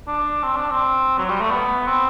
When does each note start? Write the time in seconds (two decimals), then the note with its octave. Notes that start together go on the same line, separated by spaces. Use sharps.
0.07 D4
0.43 C4
0.56 D4
0.71 C4
1.18 F#3
1.29 G3
1.41 A3
1.51 B3
1.87 C4